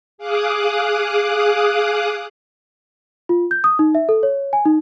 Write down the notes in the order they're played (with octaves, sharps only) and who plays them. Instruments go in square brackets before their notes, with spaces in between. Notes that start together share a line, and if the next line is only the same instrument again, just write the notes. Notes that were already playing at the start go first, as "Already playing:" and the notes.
[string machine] G#4 F5 D6 D#6 F#6
[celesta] F4
G6
D#6
D#4
E5
A4
C#5
G#5
D#4